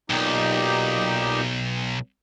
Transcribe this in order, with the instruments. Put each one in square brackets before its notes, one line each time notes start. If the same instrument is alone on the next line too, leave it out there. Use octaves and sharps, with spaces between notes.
[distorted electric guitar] B1 [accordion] A#2 D#4 G4